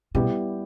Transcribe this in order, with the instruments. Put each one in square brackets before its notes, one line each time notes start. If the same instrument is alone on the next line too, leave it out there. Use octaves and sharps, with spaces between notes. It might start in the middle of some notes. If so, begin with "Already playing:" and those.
[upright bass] B2 [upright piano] G3 B3 E4 G4